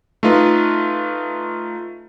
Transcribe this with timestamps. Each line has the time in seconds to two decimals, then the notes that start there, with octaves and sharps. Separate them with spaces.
0.23 A3 D#4 F4 B4